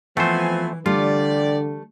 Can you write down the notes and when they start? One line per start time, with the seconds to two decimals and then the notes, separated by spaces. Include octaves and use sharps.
0.17 E3 F3 A3 B3 C4 C5 G#5
0.86 D3 G3 A3 F4 G4 D5